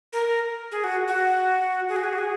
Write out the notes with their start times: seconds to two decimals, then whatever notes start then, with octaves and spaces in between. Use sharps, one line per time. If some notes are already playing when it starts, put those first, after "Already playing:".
0.13 A#4
0.72 G#4
0.84 F#4
1.08 F#4
1.89 G#4
1.96 F#4
2.03 G#4
2.13 F#4
2.18 G#4